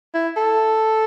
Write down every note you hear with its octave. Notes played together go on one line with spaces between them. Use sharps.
E4
A4